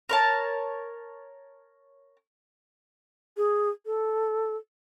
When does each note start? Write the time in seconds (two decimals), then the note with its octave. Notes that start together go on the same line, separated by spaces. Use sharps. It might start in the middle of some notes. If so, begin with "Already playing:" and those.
0.09 A#4 C#5 A5
3.37 G#4
3.86 A4